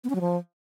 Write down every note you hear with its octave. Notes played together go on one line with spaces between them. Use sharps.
B3
C#4
F#3
F3